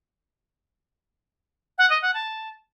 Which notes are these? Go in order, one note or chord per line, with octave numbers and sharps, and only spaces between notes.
F#5
D#5
F#5
A5